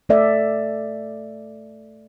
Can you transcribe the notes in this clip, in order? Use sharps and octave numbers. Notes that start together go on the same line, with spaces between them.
A3 A4 D5 E5